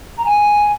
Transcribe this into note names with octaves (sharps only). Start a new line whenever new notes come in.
A#5
G#5